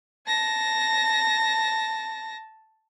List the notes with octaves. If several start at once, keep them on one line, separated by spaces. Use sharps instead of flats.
A5 A#6